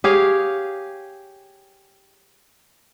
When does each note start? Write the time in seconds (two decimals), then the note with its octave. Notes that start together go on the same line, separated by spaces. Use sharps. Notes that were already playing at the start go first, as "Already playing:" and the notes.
0.04 G4 G#4 C#5 F5